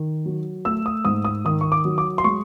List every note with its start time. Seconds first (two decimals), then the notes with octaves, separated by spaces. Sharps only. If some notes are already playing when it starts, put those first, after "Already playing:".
Already playing: D#3
0.26 F#3
0.65 A3 E6
0.86 D#6
1.05 G#2 D#6
1.25 D#6
1.45 D#3 D#6
1.61 C#6
1.72 D6
1.85 F#3
1.98 D6
2.18 C6
2.24 G#3 C#6